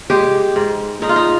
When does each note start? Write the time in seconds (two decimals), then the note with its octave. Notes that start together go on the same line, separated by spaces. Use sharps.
0.10 G#3 G4
0.56 G#2
1.02 G#2 D#4
1.09 F4
1.16 D#4